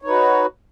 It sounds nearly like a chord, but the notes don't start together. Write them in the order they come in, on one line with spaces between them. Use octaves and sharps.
C#5 D#4 B4 F#4